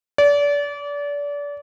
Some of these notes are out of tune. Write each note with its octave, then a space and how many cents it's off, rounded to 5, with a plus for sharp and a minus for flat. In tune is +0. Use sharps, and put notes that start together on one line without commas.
D5 -30